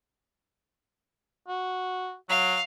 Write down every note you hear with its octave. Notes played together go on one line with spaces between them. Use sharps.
F#4
F#3 F5